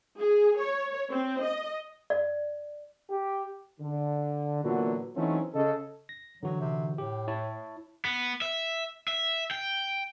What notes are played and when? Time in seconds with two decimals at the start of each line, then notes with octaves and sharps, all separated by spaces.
0.19 G#4
0.60 C#5
1.11 C4
1.44 D#5
2.10 D5
3.10 G4
3.80 D3
4.64 A#2 D3 E3 F#3 B3 F#4
5.16 E3 F#3 A3 C4 C#4 D#4
5.54 C#3 A4 D#5
6.09 A#6
6.43 D3 E3 F#3 F#4
6.60 C3
6.98 A2 G4
7.28 E4 C#5 A5
8.05 B3
8.42 E5
9.08 E5
9.51 G5